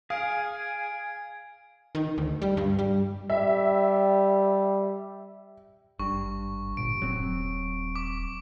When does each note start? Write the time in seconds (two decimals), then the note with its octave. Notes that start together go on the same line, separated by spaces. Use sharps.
0.10 G#4 F5 G#5 G#6 D7
1.95 D#3
2.18 D2
2.42 G3
2.57 G2
2.79 G3
3.30 G3 E5
5.99 G#1 G2 C#6
6.77 G1 A#2 D7
7.02 D#1 F#3 C4
7.96 D6